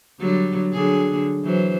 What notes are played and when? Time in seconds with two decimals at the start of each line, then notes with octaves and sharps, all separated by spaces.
0.20 D3 F#3 G3
0.73 D3 F#3 G#4
1.43 E3 F#3 C5